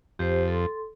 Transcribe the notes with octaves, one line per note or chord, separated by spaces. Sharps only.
F2 G4 C5
A4 C6